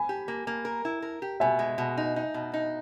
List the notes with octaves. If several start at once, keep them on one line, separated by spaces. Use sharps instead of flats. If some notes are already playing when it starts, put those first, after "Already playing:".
Already playing: G#5 B5
G4
A#3
A#3
A#4
E4
A#4
G4
B2 E5 G#5
G#3
B2
D#4
D#4
B2
D#4